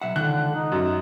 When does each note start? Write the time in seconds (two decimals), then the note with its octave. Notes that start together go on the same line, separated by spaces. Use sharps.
0.02 B1 E5 F#5
0.16 C#2 D3 D#3 F#6
0.55 D#4
0.72 F#2